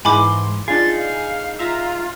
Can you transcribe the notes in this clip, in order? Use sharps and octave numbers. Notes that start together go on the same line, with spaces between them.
G#2 D#3 E3 G#3 G#5 B5 C6 D6
D4 D#4 F4 G#4 A6
F5
F4 E5 F5 A#5